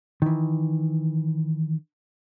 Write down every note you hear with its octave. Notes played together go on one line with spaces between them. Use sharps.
D#3 E3